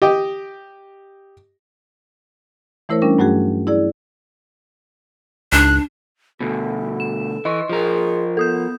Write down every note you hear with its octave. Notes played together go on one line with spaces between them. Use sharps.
G4 D#5 G5
E3 A3 E4 A#4 C5 C#5
G3 C#4 D4 A#4
G2 F#3 A3 F#4 G#4
E4 G#4 D5
C#2 G#2 D4 F#6
D2 B2 A4
E7
E3 D#5 C6 C#6
F3 G#4 A#4
B3 A4 D#6 G6